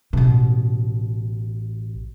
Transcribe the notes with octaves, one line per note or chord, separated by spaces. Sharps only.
A1 B2